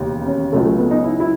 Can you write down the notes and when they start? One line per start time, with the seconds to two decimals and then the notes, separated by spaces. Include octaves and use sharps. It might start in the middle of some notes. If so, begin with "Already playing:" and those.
Already playing: E1 D#2 C#3
0.26 C#4
0.52 C#2 C#3 F#3 A3
0.65 A3
0.78 B3
0.91 D#4
1.04 E4
1.20 E4